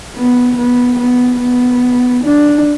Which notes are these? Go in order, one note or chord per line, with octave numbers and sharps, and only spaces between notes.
B3
B3
B3
B3
D4